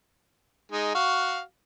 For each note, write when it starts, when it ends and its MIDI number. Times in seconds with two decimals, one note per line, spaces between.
0.72 0.93 56
0.72 0.93 63
0.95 1.40 66
0.95 1.40 77